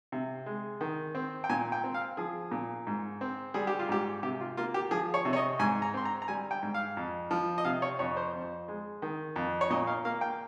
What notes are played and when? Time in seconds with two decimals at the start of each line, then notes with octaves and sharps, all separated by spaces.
0.12 C3
0.46 G#3
0.81 D#3
1.15 C4
1.44 G5
1.49 A#2 G#5
1.72 G5
1.84 C4
1.94 F5
2.17 F3 G#4
2.51 A#2
2.87 G#2
3.21 C4
3.54 G3 G#4
3.67 G4
3.79 F4
3.89 G#2 G4
4.23 C3 G4
4.41 F4
4.57 A#3 F4
4.74 G4
4.91 F3 G#4
5.14 C#5
5.25 C3
5.33 C#5
5.36 D#5
5.59 G#2 G#5
5.82 A#5
5.94 C4 C6
6.05 A#5
6.22 A#5
6.28 G3 G#5
6.51 G5
6.63 G#2
6.74 F5
6.97 F2
7.31 F3
7.58 D#5
7.65 C3 F5
7.82 C#5
7.99 F2 C#5
8.17 C5
8.33 F2
8.68 G#3
9.02 D#3
9.36 F2
9.61 C#5
9.70 A#2 D#5
9.87 F5
10.05 A#3 F5
10.21 G5